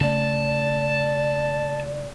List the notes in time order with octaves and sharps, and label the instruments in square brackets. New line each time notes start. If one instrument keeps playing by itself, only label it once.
[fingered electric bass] C#3 A3 [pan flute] D5 [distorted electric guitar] A5